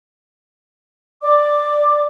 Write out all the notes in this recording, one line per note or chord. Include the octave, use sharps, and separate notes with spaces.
D5 D6